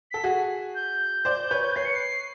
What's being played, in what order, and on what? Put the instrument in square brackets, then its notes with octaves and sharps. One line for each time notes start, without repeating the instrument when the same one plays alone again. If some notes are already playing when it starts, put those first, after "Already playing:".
[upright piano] A4 [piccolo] B6
[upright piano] F#4 G#4
[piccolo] G6
[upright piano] C5 D5
B4 C#5
[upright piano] B4 C#5 [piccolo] C7
[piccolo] C#7
C7